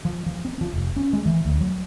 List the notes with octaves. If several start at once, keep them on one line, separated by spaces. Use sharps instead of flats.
F3
F3
C4
F3
F1
C#4
G#3
E3
D2
F#3